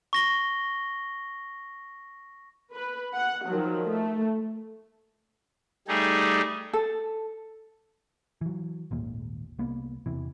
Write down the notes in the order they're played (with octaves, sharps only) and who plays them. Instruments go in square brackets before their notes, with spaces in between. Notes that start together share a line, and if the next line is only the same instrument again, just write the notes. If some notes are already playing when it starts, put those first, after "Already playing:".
[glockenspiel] C#6 A#6 G7
[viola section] B4
F#5
D#3 F3 F#3
A3
[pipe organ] G3 A3 D#4 G#4
[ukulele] A4
[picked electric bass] E3 F#3
G#1 D#2 A#2
C2 A#3 B3
E2 C3 E3